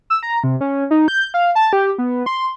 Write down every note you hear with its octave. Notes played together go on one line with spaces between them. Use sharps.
E6
A#5
C3
C#4
D#4
G6
F5
A5
G4
B3
C6